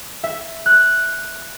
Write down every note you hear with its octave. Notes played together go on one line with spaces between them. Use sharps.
E5
F#6